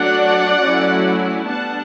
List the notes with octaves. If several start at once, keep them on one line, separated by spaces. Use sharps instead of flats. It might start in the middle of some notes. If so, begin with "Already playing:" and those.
Already playing: F#3 A3 D4 D5 F#5
F#3 A3 C#4 E4
G3 B3 D4 F#5 A5